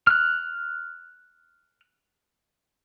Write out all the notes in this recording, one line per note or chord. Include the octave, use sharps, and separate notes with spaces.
F6 F#6